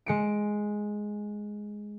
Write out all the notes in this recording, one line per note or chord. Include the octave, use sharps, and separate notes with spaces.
G#3 C#7 D7